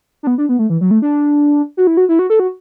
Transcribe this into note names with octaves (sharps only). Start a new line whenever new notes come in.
D4
B3
D4
B3
A3
E3
F#3
A3
D4
F#4
E4
F#4
E4
F#4
A4
F#4